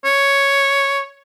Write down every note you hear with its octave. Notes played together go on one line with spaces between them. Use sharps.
C#5